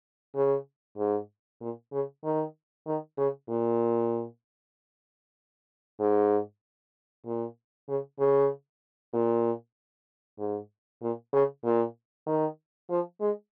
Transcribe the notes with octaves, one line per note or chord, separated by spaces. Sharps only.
C#3
G#2
A#2
C#3
D#3
D#3
C#3
A#2
G#2
A#2
C#3
C#3
A#2
G#2
A#2
C#3
A#2
D#3
F3
G#3